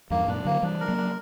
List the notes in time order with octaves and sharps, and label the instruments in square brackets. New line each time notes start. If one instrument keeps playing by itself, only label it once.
[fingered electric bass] E2 G2 [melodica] A#3
[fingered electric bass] F#2 A#2 [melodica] D4
[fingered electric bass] D3 F#3 [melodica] A#3
[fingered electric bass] E3 G3 [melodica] D4
[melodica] A#4
[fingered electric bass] F#3 A#3
[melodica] D4